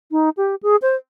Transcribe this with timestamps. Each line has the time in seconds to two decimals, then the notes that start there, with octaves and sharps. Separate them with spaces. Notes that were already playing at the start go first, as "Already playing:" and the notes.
0.11 D#4
0.37 G4
0.63 G#4
0.82 C5